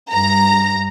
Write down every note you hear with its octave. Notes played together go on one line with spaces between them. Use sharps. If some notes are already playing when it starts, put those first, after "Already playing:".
G2 A#5